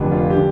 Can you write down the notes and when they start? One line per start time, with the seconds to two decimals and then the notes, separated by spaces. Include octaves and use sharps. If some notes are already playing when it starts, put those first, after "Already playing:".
Already playing: F1 F2 D3
0.12 F4
0.30 D3 G4